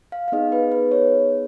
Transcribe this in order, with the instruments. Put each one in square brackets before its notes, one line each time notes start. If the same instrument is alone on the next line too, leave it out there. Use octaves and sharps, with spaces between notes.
[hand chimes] F5
F5
B3 D#4 G#4 D#5
B4
B4
C#5